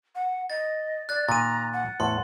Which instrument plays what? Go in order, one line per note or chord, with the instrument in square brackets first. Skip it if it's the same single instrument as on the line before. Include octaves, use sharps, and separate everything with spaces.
[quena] F#5
[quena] D#5 [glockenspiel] A6
[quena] D5 [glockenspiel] F#6 A6
[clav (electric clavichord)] A#2 D#3 [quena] A#5 [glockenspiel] A6 D#7
[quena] F#5
[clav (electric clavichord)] E2 A2 [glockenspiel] C6